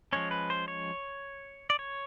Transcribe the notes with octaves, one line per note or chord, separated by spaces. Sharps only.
F3 G#3 C#4 C#5
B4
C5
C#5
D5
C#5